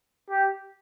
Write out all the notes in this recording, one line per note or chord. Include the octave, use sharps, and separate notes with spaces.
G4